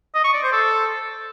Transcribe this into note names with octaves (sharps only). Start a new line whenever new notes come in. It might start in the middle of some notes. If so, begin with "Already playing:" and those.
D#5
C#6
D5
C5
A4